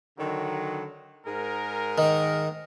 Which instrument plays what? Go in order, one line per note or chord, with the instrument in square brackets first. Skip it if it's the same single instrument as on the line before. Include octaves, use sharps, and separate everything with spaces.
[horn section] D3 D#3 F#3
G#2 G#4 A#4
[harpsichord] D#3